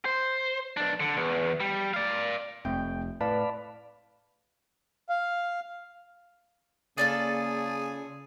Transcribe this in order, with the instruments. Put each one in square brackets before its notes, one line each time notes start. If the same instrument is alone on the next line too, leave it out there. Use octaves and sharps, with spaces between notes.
[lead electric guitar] C5
B1 D4
D3
E2
G3
D5 F5
[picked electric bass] F1 [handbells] A3 C4 [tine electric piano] G5
[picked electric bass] A2 [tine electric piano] B4 [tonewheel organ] D5 F5 B5 [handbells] A5
[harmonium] F5
[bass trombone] C#3 [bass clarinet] A#3 [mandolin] F4 A4 D5 [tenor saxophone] G#4